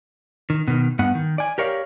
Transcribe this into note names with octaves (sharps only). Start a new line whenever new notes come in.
D#3
B2 D#3
G2 B3 F#5
D#3
D5 G#5
G4 A#4 C#5 D5 F5